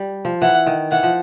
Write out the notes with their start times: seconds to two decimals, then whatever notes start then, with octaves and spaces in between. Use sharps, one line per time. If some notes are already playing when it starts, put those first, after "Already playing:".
Already playing: G3
0.25 F3
0.42 E3 F#5
0.67 D#3
0.92 E3 F#5
1.03 F3